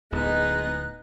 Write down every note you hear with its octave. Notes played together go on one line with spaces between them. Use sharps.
D1 D2 G#3 B3 D#4 G#4 F#6